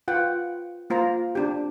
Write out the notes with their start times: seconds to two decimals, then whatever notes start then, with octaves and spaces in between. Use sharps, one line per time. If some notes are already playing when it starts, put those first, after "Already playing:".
0.08 F4 B4 F#5 G5
0.90 A#3 F4 C5 A#5
1.35 C4 D4 G4